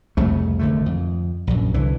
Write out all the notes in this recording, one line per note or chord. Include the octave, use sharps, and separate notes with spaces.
C2 F2 C#3 A3
G#1 D3 A3
F2
A#1 F#2
C2 D3 E3